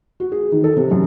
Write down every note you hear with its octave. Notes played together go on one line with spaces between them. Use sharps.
F#4
G#4
D#3
A4
C3
F#2